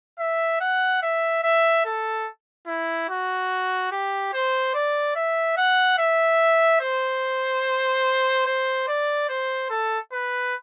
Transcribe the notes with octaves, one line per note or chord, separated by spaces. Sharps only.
E5
F#5
E5
E5
A4
E4
F#4
G4
C5
D5
E5
F#5
E5
C5
C5
D5
C5
A4
B4